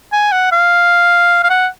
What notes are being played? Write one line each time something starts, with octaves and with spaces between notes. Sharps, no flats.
G#5
F#5
F5
F5
F#5